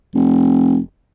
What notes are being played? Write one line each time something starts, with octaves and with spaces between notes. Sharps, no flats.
F1